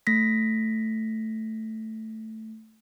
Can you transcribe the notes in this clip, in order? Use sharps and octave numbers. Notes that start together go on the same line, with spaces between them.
A3 A#6 B6